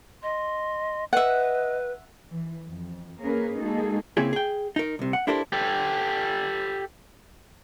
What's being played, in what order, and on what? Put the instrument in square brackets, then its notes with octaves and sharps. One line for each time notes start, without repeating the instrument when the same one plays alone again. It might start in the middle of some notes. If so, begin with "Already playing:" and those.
[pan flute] D#5 [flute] C6
[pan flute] B4 [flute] D#5 [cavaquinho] E5 F#5
[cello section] E3
F2
A#3 C#4 G#4 A#4 B4
G#3 A#3 D#4 F#4 G#4 A4
[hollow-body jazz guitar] C#3 A#3 C4 C#4 E4 G#4
G#4 G5
D#4 A#4
C2 C3
F#5
D4 E4 G4 A4 A#4 C5
[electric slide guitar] G4 A4